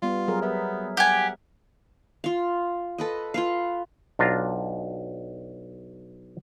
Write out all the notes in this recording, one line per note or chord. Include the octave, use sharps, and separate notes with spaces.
G3 B3 F4
F#3 G#4 A#4
B3 E5
G4 F#5 G#5
F4 F5
A4 B4 D#5
F4 B4 F5
B1 D4 F4 A#5